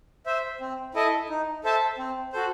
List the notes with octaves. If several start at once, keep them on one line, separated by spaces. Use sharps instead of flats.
C5 E5
C4
E4 A4 D#5
D#4
A4 C5 E5 A5
C4
F#4 A4 C5